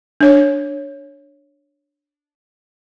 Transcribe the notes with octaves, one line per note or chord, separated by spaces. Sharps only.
D4 C#5